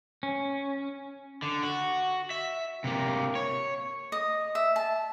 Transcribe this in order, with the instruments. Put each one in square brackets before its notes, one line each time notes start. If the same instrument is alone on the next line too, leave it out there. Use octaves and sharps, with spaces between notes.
[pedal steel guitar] C#4
[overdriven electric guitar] D3
F#4
E5
C3 A#3
C#5
[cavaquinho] D#5
E5
A5